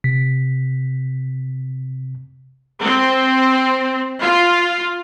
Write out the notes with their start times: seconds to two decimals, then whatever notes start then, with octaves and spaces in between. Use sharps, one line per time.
0.04 C3 B6
2.82 C4
4.21 F4